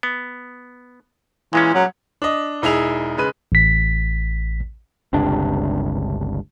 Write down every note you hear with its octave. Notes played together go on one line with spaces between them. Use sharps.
B3
A#2 E3 G#3 C#4
F#3
D4 D#5
E1 D#4 E4 G#4 F7
C#3 G#3 B4 D#7
A1 B6
G1 C#2 C3 D4